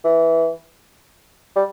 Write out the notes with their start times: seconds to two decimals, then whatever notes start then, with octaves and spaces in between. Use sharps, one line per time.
0.05 E3
1.56 G3